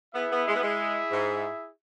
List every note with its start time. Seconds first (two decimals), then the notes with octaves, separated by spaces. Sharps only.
0.14 B3 E4 G#4 E5
0.31 B3
0.47 G#3
0.55 B3
0.62 G#3
1.11 G#2